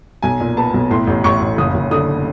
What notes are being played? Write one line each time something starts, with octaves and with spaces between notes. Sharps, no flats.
B1 G#5
A#2
B3 A5
B1
A2 C6
A1
A1 C#6
A1
F#1 D#6
F#1
D3 D#6